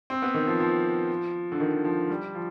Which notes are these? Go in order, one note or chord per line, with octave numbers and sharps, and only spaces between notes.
C4
B3
D#3
F3
F3
D3
D#3
F3
G3
F3